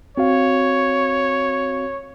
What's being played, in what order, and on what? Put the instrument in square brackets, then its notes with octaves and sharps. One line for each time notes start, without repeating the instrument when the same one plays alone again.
[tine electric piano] C4 F#4 F5 [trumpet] C#5